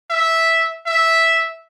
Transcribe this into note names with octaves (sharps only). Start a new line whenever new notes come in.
E5
E5